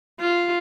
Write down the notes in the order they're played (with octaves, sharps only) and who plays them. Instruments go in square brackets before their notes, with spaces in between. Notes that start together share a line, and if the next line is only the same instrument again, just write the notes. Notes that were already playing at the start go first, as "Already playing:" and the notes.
[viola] F4